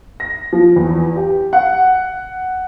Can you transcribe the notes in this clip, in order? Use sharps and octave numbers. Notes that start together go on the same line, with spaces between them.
A#6
F3
E2
G4
F#5